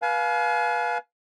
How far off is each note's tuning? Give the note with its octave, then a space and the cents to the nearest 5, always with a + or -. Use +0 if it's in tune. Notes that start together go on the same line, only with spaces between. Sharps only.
B4 -25 F5 +5 G#5 +40